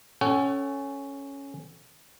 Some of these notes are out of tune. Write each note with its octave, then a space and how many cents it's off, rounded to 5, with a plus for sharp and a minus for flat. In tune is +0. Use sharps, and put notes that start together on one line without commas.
C#4 +0 A4 +0 F#5 +45